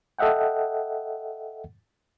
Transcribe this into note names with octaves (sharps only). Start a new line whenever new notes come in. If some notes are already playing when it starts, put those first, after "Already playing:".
A4 D#5 E5 F#5 G5